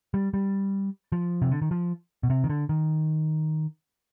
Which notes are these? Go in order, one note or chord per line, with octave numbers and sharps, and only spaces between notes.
G3
G3
F3
C3
D3
D#3
F3
B2
C3
D#3
D3
D#3